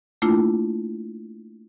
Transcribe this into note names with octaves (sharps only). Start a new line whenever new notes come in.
A3 A#3 D4 E4 F4